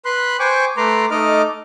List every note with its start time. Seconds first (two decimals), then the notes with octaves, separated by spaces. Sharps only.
0.05 B4 B5 C6 F#6
0.39 C5 G5 G#5 C#6 D6
0.77 A3 B4 A#5 C6 D6
1.11 A3 D#4 D#5 D6 F6